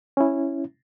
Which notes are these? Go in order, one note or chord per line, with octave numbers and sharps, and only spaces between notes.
C#4 E4